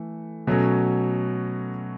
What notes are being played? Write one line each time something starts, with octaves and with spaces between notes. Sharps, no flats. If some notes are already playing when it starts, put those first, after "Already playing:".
Already playing: E3 A3
B2 F#3 A3 C#4